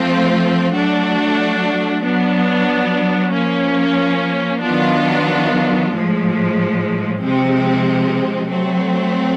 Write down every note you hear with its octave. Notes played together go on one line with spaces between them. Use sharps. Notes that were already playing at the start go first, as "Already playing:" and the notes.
Already playing: F3 A3 C4 F4
F#3 A3 D4 F#4
F#3 B3 D4
F3 A#3 C#4
D#3 F#3 B3 D4 F4
A2 F3 G#3
C3 F3 G#3 C4
F#3 A3 C4